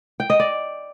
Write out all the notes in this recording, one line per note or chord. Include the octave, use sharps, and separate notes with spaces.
G5
D#5
D5